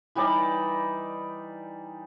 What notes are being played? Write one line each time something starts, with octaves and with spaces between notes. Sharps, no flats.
E3 G3 D#4 D5